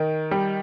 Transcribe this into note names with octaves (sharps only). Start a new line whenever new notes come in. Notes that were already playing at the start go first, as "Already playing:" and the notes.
Already playing: D#3
G3